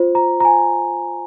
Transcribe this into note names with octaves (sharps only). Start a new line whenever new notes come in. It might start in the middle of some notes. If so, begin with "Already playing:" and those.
Already playing: F4 C5
A#5
A#5
G#5